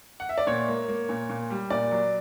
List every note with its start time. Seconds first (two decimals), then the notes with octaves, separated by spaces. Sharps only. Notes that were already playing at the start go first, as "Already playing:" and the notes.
0.20 F#5
0.29 E5
0.38 D5
0.47 A#2 C#5
0.68 A#3
0.88 A#3
1.09 A#2
1.30 A#2
1.50 G3
1.70 A#2 D5
1.91 F#3